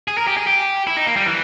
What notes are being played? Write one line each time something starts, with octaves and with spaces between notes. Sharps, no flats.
G#4
A#4
G4
G#4
G4
E4
D#4
A#3
G3
E3